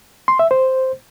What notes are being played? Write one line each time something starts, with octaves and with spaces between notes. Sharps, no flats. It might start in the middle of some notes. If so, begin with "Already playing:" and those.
C6
E5
C5